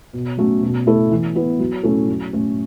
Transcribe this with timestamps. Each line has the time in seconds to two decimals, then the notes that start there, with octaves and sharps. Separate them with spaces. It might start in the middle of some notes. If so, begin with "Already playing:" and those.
0.13 B2
0.38 F#3 A3 C#4 F#4
0.63 B2
0.87 A3 E4 A4
1.11 E3
1.35 B3 E4 B4
1.59 F#3
1.83 A3 C#4 E4 A4
2.08 F#3
2.33 A3 C#4